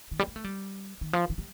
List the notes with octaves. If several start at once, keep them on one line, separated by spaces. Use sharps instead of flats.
D#3
G3
A#3
A3
G3
D#3
F3
D#3
G3